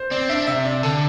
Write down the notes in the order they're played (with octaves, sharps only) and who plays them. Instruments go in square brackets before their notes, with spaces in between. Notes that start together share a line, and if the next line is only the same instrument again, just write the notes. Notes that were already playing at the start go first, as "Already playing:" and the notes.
Already playing: [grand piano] C5
[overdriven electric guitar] C4 [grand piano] D5
[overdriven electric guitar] D4 [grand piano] E5
[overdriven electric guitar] C3 [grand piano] E5
[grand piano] D5
[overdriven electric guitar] D3 [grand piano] A4